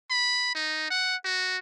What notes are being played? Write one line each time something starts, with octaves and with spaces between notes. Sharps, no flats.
B5
D#4
F#5
F#4